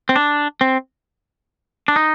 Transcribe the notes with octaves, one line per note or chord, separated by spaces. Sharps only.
C4
D4
C4
D4
D#4